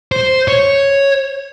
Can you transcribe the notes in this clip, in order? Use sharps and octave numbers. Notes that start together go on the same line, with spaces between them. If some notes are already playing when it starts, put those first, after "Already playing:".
C5
C#5